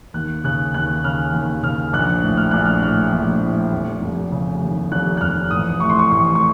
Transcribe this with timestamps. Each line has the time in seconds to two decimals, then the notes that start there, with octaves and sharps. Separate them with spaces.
0.14 D#2 F#6
0.44 C#3 F#6
0.74 D#2 F#6
1.04 C#3 F6
1.33 D#2
1.63 C#3 F6
1.93 A#1 F#6
2.23 A2
2.37 F6
2.51 A#1 F#6
2.66 F6
2.82 A2 F6
3.12 A#1
3.43 A2
3.73 F1
4.01 F1
4.32 C#3
4.62 D#2
4.92 F1 F#6
5.17 F#6
5.21 F1 F6
5.51 A1 D#6
5.80 A2 C#6
5.90 C6
5.99 C#6
6.11 A1 C#6
6.35 C#6